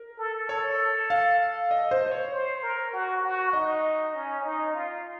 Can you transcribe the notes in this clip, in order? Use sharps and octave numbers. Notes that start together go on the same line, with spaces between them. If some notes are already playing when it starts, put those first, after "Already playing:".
Already playing: A#4
A4
A4 C#5
F5
D#5
C5
C5
C#5
C5
A#4
F#4
F#4
D#4 D#5
C#4
D#4
F4